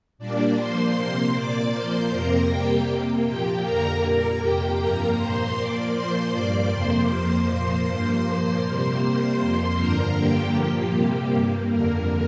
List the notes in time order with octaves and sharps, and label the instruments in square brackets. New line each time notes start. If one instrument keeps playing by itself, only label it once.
[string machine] A#2 G3 A#3 D4 D5
A#2 F3 A#3 C5 C6
C3 A#3
A#2 A#3 D5 D6
A#2 F3 A#3 C5 C6
F2 C3 A#3 A#4 A#5
C3 G3 A#3 G4 G5
C3 A#3
A#2 F3 A#3 G4 G5
F2 D3 A#3 A#4 A#5
A#2 G3 A#3 A#4 A#5
F2 C3 A#3 G4 G5
G2 F3 A#3 A#4 A#5
A#2 A#3 C5 C6
A#2 F3 A#3 D5 D6
A#2 F3 A#3 C5 C6
G2 G3 A#3 D5 D6
F2 C3 F3 A#3 C5 C6
F2 F3 A#3 C5 C6
A#2 F3 A#3 C5 C6
G2 F3 A#3 C5 C6
A#2 F3 A#3
C3 G3 A#3 C5 C6
C3 G3 A#3 C5 C6
F2 F3 A#3 C5 C6
G2 D3 F3 A#4 A#5
G2 D3 G3 A#3 G4 G5
A#2 F3 A#3 G4
C3 G3 A#3
G2 G3 A#3
F2 D3 A#3 A#4